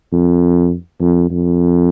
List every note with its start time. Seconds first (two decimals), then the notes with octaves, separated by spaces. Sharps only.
0.12 F2
1.01 F2
1.30 F2